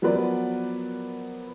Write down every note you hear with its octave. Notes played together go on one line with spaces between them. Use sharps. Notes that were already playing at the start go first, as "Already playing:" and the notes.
F3 F#3 B3 A#4 B4 D5